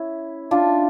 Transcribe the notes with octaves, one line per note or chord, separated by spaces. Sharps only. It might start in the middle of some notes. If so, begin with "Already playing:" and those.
Already playing: C#4 E4
D4 F4